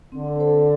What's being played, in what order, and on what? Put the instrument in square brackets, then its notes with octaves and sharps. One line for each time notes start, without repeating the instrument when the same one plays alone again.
[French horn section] D3 [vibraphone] C4
[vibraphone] A4 C5